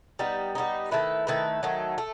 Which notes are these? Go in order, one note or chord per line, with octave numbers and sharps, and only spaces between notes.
G3 B3 D#4
G3 B3 D#4
D#3 A3 E4 B4
D#3 A3 E4 B4
D#3 F#3 A3
A3